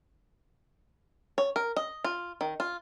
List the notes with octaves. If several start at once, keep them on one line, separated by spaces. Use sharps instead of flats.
C#5
A#4
D#5
F4
D#3
F4